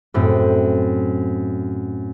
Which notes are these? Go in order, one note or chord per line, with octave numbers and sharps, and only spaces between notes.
F#2 A2 C4